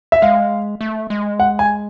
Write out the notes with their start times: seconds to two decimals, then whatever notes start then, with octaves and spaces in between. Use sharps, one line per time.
0.12 E5
0.22 G#3 F5
0.81 A3
1.10 G#3
1.40 F#5
1.59 G#5